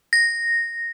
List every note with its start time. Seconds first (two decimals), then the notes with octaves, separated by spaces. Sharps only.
0.13 A#6